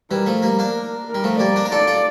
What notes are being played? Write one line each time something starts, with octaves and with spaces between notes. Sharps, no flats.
E3 G3 A#4
F3 A3
G3 A#3 A#4
A#3 D4
A#4
G3
F3 A3
G3 A#3 D5
A#3 D4
A#4
F4 A4 D5
F4 A4